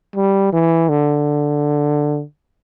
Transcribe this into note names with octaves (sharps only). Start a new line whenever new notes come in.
G3
E3
D3